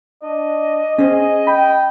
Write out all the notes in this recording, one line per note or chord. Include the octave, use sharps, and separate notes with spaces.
D4 D#5
C#4 G#4 C5
G5 B5